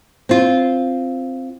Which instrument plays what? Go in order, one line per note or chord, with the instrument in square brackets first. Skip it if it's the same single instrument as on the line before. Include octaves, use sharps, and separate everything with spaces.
[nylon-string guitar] C4 F4